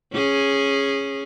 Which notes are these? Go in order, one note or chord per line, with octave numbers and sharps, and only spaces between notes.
C#4 G#4